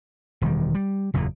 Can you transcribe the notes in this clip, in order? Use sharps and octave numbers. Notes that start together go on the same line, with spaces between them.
E1 D#3 G3
G3
F#1 E2 A#2